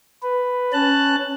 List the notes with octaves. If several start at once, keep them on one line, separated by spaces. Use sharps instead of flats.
B4
C#4 A5 F#6